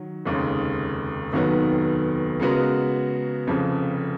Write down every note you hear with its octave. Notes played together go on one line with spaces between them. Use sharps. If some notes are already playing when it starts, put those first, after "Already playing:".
Already playing: D#3 F#3
F1 D#2 C#3 G#3
F1 D#2 D#3 F#3 B3
C#3 G#3 B3 F#4 A#4
F1 F2 C#3 F3